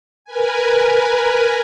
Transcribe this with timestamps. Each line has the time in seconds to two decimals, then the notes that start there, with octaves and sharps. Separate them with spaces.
0.25 A#4 B4 G#5